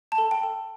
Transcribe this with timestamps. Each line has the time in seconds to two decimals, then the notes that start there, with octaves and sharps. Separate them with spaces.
0.12 A5
0.18 A4
0.31 G5
0.43 A4